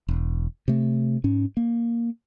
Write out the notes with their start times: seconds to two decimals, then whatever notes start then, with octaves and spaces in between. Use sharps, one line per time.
0.08 E1
0.68 C3 A3
1.24 G#2 C#4
1.57 A#3